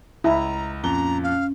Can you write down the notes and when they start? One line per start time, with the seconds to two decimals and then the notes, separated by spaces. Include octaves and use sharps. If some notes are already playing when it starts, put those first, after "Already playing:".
0.24 C#2 E4 A#5
0.83 F2 A#2 C#4 A#5 G7
1.23 C#4 F5